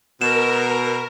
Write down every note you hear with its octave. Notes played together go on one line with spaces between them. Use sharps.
B2 A#4 E7